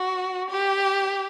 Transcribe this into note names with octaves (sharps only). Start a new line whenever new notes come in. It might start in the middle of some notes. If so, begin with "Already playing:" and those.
Already playing: F#4
G4